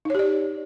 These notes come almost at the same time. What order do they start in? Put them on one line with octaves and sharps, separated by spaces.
D#4 C#5 G4 D5